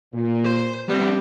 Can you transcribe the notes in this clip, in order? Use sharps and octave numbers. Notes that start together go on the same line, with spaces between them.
A#2
C5 C6
F3 G3 A3 B3 C4 D4